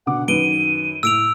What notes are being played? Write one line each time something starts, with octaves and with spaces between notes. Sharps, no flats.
B2 D3 F#5 D6
F#2 D#3 B4 D7 D#7 G7
A2 E6 D7 F7